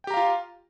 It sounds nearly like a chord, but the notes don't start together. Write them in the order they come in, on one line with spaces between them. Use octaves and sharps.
G5 G4 A#5 F5 F4